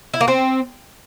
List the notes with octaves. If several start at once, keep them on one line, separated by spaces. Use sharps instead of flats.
E4
A#3
C4